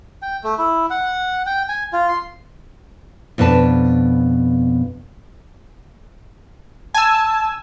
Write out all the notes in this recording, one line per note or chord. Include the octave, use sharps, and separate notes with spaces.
G5
A3
E4
F#5
G5
G#5
F4
C6
F2 B2 D4 B4 A5
G#5 A5 E6